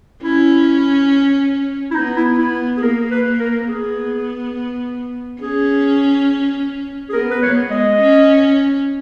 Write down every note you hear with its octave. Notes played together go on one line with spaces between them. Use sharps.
C#4 E4
E4
B3 D#4
E4
B3 E4
G#4
A#3 A#4
B4
A#4
B3 G#4
C#4 G#4
G#4
B3 A#4
B4
B3 C#5
G#3 D#5
C#4